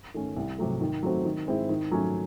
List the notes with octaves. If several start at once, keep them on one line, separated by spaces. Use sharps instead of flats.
D#3 A3 C#4
C2
C3 F#3 A3
D#3
F#3 A3 C4 F#4
D#3
G#3 C4 E4
D#3
F#3 A3 C#4